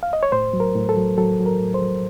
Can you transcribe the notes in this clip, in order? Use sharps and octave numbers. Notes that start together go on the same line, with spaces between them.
F5
D#5
C#5
A2 C5
F#3
A#4
A2
A4
F#3
F#3 A4
F#3
A#4
A2
C5
F#3